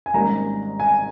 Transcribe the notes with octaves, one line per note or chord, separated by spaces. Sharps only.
G#5
G#1 G#2 G3 A#3 C#4 A#5
G#5